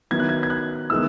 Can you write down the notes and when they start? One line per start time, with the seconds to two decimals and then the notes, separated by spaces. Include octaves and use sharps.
0.11 D#3 F#3 B3 E4 G#6
0.20 F#6
0.29 G#6
0.43 G#6
0.50 F#6
0.90 D#3 G#3 B3 E4 E6